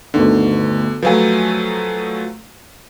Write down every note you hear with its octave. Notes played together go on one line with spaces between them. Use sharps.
G1 D2 D3 D#3
F3 F#3 A3 B4 F5 G#5